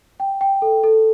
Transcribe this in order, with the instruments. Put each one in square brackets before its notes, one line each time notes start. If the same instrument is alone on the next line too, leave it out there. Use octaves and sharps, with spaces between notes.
[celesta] G5
G5
A4
A4